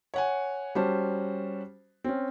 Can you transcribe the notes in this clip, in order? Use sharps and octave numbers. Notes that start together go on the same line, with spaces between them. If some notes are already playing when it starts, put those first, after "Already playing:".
C#5 F#5 G#5
G3 C#4 F#4 C5 A5
C4 C#4